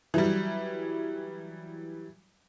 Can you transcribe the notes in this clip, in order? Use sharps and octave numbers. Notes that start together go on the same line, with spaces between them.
E3 F#3 G3